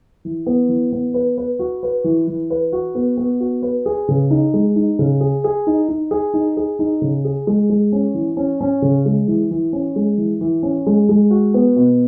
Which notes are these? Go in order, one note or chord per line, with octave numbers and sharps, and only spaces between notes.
E3
B3
E3
B3
B4
B4
F#4
B4
E3
E3
B4
F#4
B3
B3
F#4
B4
G#4
C#3
D#4
G#3
D#4
C#3
G#4
G#4
D#4
D#4
G#4
D#4
G#4
D#4
C#3
G#4
G#3
G#3
C#4
E3
C#4
C#4
C#3
G#3
E3
E3
C#4
G#3
E3
E3
C#4
G#3
G#3
F#4
B3
B2